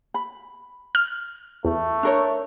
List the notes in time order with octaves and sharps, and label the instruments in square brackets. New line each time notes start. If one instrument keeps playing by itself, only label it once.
[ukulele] B5
[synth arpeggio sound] F6
[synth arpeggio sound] E2 [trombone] A3
[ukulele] D4 A#4 C#5